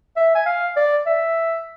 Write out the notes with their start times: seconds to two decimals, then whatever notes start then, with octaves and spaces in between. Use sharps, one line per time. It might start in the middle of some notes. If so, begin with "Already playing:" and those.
0.17 E5
0.35 G#5
0.46 F5
0.77 D5
1.06 E5